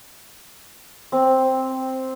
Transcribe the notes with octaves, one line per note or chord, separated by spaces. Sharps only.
C4